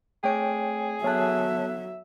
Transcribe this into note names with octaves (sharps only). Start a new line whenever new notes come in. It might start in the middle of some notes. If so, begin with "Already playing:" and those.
A3 C4 G#4 C#5 G5 D7
F#3 B3 A4 C#5 E5 A5 F#6